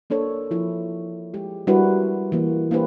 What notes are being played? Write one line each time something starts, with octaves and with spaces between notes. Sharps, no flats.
A#3 D4 A4 C#5
F3 E4
G#3 G4
G3 D4 E4 F#4 A#4 B4
E3 A#3
A#3 D4 E4 G4 B4 C5